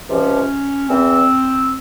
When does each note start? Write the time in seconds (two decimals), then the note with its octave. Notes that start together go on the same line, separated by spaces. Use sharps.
0.09 C#2 C3 F3 C#4
0.89 E2 E3 C4